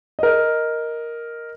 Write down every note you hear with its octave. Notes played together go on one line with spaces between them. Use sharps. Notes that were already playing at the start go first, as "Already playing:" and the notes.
A#4 D#5